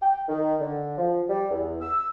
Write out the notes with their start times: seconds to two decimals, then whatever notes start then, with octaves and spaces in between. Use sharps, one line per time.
0.01 G5
0.28 D#3
0.60 D3
0.97 F3
1.29 G3
1.50 E2
1.81 E6